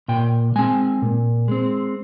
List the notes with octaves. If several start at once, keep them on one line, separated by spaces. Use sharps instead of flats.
A#2 G5
G#3 C4 G#5
A#2
G#3 C4